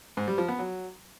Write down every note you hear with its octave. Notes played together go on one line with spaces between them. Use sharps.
G#2
G3
F3
B3
F#3